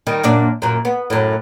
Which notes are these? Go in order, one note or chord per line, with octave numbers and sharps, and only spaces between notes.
D#3 G3
F#2 A#2 D4
F#2 A#2
B3
F#2 A2